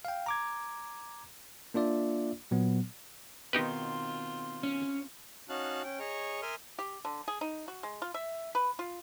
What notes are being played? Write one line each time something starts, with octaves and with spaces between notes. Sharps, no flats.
F5 G5
A#5 D6 G#6
A#3 D4 F4 D5 E5
A#2 F#3 B3
B2 D#3 C4 D#4 F4 G4 B4
C#4
C#4 D#4 F#4 F5 A5 F#6
C#4 G5
G#4 C#5 D#5 A#5 C#6
A#4 E5 G#5 C6 D#6 F6
G4
D3
G#4
D#4
F#4
G#3
F4
E5
B4
F4